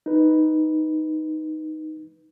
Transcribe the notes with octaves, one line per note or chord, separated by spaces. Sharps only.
D#4 B4